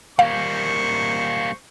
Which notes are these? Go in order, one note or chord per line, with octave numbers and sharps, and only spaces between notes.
G3 A#3 C5 F5 C#6